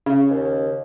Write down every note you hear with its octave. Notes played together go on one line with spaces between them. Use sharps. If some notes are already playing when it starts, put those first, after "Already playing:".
C#3
D#2